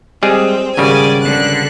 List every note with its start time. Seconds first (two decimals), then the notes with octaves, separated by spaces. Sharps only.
0.23 G3 G#3 C4 G#4
0.77 G#1 C#3 G3 D5 G#5
1.21 D3 F#6